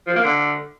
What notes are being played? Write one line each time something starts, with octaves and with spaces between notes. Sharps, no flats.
F3
A#3
D3